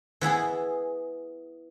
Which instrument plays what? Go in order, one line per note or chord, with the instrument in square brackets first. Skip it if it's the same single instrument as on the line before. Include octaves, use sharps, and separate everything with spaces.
[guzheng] E3 B3 E4 G#4